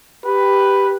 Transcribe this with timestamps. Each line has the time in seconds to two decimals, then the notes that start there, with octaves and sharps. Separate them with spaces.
0.24 G4 B4